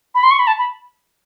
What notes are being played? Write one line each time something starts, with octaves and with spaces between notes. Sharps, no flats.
B5
C6
C#6
B5
A5
B5